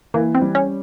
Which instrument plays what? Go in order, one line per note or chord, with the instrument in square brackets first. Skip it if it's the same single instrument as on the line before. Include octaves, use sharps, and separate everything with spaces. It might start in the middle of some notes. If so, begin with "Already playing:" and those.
[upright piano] E3 [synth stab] A#3
[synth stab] C4
[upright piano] G3
[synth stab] C#4